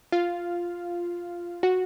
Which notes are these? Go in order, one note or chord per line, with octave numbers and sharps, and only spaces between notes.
F4 F5
F#4 F#5